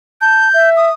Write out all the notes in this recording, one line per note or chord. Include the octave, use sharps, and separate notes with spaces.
A5 G6
E5
D#6